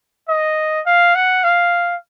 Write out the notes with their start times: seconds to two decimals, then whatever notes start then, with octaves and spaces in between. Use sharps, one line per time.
0.29 D#5
0.86 F5
1.15 F#5
1.44 F5